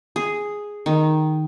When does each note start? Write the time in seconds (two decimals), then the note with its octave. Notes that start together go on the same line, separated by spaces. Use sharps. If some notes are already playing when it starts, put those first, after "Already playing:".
0.16 G#4
0.86 D#3